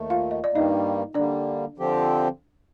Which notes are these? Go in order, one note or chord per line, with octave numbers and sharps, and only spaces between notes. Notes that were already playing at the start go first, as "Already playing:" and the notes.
Already playing: D#2 D#3 A3
F4 F5
D#5
D5
G2 D#3 G3 A#3 D#4 D#5
D3 G3 A#3 D4 D5
D3 F3 C4 G4